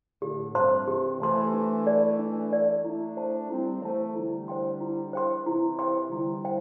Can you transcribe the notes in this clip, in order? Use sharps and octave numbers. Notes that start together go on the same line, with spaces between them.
A2 D3 G4
G2 C3 C5 A5 C6
C3 E3 G4
E3 A3 C5 A5 C6
D4
A4 D5
D4
A4 D5
A3 D4 E4
C5 A5
G3 C4 E4
E3 A3 C5 A5
D3 G3 E4
C5 G5 C6
E4
C5 G5 C6
C3 E3 E4
C5 G5 C6
D3 G3 E4
C5 G5